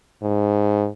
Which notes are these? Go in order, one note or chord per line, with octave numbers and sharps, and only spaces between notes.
G#2